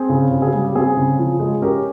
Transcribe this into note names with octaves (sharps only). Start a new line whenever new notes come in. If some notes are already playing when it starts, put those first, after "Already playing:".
Already playing: C4 G#4
C#3
C#3
G#4
G3 G4
G4
C4 G#4
C#3
F3
G#3
C#4 G4 A#4